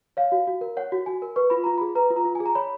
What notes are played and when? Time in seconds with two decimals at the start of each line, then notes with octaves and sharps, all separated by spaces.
0.17 C#5 F5
0.32 F#4
0.47 F#4
0.61 A#4
0.77 C#5 F#5
0.92 F#4
1.06 F#4 G#5
1.22 A#4
1.36 B4 C#6
1.50 F4 B5
1.64 F4 A#5
1.78 B5
1.81 G#4
1.95 B4 A#5
2.10 F4
2.16 A#5
2.25 F4
2.35 G#5
2.40 G#4
2.46 A#5
2.55 C#5 B5